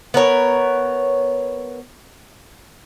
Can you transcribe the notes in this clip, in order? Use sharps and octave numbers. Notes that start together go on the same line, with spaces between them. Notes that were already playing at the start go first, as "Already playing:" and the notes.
B3 A#4 C#5